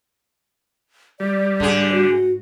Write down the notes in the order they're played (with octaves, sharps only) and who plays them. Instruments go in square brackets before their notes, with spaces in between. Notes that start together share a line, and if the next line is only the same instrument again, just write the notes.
[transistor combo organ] G3 [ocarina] D5
[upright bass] G#2 [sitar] D3 G#4
[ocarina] F#4